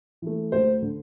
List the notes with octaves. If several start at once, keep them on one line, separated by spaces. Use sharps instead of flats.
E3 A3
D2 C5
D3